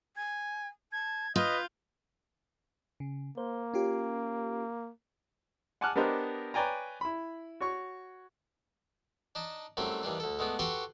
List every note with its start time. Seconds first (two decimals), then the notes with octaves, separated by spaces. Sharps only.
0.17 G#5 G#6
0.92 A5 G#6
1.36 F4 B4 D#5 G6
3.00 C#3
3.38 A#3 C5
3.74 C#4 F4 G4
5.81 F#5 G#5 A5 D6 F6 F#6
5.96 B3 D4 G4 A#4 C5 D#5
6.54 B4 C#5 D5 G5 G#5 A#5
7.01 E4 B5
7.61 F#4 C#5 C#6
9.35 D4 D#4 A5
9.77 F#2 G3 A3 C4 E4
10.03 D#2 E3 G3 D4
10.20 D2 A4
10.39 G#3 A3 B3 D4
10.59 F#4 G4 A4 B4 C6 C#6